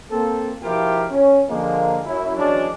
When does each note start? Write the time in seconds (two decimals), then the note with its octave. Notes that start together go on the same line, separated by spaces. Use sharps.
0.10 A#3 C4 A4
0.63 B2 F3 E4 F4 G4 A#4
1.10 C#4
1.48 D3 F3 G#3 A#3
2.04 F#2 E4
2.36 E2 F#3 G#3 C#4 D4